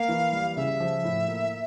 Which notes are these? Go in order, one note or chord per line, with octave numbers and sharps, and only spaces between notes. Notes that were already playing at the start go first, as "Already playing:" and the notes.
Already playing: A#3 F5
E3
G3
C#3 E5
F3
A2
A#3